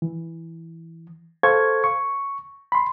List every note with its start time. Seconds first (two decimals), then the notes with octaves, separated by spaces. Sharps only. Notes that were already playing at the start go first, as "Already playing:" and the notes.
0.02 E3
1.43 A4 C5 F5 C#6 G#6
1.84 C#6
2.72 B5 C6